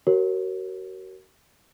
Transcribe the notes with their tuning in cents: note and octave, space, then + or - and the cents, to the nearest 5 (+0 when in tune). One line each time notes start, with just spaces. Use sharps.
F#4 +35 A#4 +0 C#5 -30